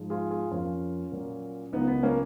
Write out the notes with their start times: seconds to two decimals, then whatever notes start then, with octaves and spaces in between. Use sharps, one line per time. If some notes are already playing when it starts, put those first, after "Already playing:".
Already playing: G#2 F3 G#3
0.10 F4 G#4
0.31 F4 G#4
0.51 F2 F3 A#3 C#4 F4
1.12 A#2 F#3 A#3
1.72 C#2 C#3 F#3 A#3 B3 D#4
1.88 B3
2.03 A#3 C#4